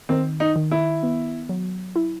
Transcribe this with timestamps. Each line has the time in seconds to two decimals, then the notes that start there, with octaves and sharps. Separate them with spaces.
0.09 D#3 C4
0.40 D#4
0.56 D#3
0.71 E4
1.03 B3
1.49 F#3
1.96 E4